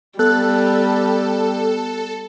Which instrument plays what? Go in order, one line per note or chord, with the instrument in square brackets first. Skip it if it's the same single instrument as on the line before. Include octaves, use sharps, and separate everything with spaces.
[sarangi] G3 [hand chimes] B3 F#6 [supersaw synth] A4